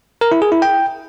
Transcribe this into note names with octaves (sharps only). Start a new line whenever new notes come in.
A#4
E4
G#4
E4
G5